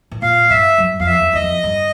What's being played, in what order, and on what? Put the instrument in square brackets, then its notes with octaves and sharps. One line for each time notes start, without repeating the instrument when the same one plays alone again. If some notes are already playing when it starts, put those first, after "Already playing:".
[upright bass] A2
[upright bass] A#2 [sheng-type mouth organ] F5
[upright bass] G2 [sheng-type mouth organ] E5
[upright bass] F#2
[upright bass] F2 [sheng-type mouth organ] F5
[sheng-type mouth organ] E5
[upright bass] E2
[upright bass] E2 [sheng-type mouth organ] D#5
[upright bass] F2
G2